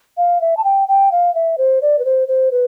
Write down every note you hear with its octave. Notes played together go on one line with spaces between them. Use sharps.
F5
E5
A5
G5
G5
F5
E5
C5
D5
B4
C5
C5
B4